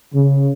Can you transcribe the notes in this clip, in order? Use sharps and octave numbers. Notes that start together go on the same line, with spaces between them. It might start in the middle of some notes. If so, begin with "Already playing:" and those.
C#3